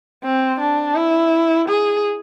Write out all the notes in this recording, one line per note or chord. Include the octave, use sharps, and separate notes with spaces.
C4
D4
E4
G#4